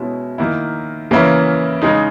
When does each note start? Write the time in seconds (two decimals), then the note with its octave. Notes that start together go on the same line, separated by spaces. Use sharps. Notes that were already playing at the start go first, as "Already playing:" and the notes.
Already playing: B2 G#3 C#4 E4
0.38 D#3 A#3 E4
1.11 C#3 E3 A#3 C#4 E4
1.82 C#3 G#3 D#4